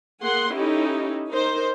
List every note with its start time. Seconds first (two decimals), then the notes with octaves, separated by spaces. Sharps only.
0.22 A#3 G#4 F#5 C6
0.52 C#4 D#4 E4 G4 A4
1.29 D#4 A#4 C5